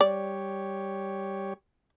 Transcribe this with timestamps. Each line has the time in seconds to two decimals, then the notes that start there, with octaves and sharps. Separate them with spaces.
0.01 G3 G4 C#5 D5